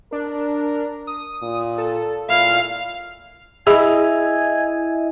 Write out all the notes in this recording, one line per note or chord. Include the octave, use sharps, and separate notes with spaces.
D4 A#4
D#6
A#2
A4
A#2 E4 F5
E4 G#4 D#5 E5 G#5